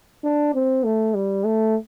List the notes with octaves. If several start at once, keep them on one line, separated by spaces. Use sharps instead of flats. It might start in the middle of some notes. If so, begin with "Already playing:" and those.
D4
C4
A3
G3
A3